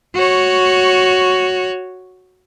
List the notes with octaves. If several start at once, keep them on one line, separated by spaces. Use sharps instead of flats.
F#4 C#5